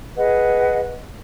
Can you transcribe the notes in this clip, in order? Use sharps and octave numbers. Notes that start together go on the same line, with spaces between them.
G#4 B4 D#5 F#5